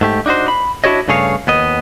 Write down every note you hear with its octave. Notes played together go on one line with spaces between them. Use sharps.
G#2 A3 G4
D4 D#4 F#4 C5
B5
D4 E4 F#4 G4 C#5 D#5
G2 C#3 A3 G#4 C#5 F5
D#2 B3 D#5